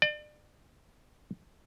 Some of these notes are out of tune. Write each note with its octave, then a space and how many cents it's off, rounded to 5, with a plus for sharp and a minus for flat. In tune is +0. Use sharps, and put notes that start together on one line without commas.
D5 +35